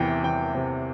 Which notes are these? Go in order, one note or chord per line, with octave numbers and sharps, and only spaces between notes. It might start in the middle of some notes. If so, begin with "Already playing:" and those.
Already playing: E2 C3 E3 G5
E2 G5
C3